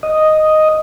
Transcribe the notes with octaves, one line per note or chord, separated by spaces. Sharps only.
D#5